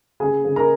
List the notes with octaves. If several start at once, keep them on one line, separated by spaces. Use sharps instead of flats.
C#3 G#4 G#5
C#3
A#4 A#5